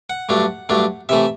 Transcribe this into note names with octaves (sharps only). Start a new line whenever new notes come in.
F#5
G2 F#3 A3 D4
G2 F#3 A3 D4
C3 E3 A3 E5